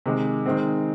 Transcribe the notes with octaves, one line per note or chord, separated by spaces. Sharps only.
C3 D#3 G#3
D#3 G#3 C4